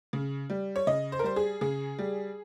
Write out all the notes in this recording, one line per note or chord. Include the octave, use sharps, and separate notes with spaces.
C#3
G3
C#5
C#3 D#5
C5
A#4
G3 C5
G#4
C#3 G#4
G3